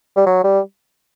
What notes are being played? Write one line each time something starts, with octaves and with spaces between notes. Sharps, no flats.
G3
F#3
G3